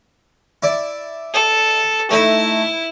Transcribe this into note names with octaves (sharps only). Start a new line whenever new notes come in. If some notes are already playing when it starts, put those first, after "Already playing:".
E4 D5
A4
A3 D#4 E4